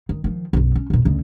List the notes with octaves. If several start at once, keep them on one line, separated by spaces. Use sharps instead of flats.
D#3
D#3 F3
B1 F#2
C#4
E2 A#2
D2 C#3